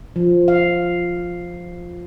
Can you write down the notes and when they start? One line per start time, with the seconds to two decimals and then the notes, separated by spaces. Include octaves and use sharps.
0.16 F3
0.48 F5